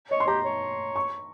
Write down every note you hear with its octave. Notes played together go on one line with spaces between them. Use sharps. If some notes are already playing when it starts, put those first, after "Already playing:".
C#5 D#5
C6
G4 A#5
C#5
C#6